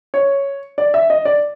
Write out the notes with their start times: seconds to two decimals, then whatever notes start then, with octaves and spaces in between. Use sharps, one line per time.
0.14 C#5
0.78 D5
0.94 E5
1.10 D#5
1.25 D5